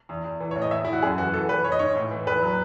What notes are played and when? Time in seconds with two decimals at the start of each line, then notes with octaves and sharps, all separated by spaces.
0.09 E2
0.24 E2
0.40 E3
0.51 A2 C#5
0.62 D#5
0.71 E2 E5
0.85 E2 E4
0.93 F#4
1.02 F#2 G#4
1.18 E3 F#4
1.33 E3 A4
1.49 E3 B4
1.64 E3 C#5
1.72 D#5
1.79 G#2 C#5
1.96 A2
2.11 E3
2.26 E2 B4
2.42 F#3